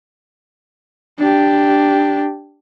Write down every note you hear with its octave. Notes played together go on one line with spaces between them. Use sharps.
D4 G4